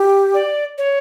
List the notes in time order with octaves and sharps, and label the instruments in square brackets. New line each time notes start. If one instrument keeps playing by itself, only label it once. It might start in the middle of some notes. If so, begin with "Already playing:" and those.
Already playing: [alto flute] G4
[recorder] D5
C#5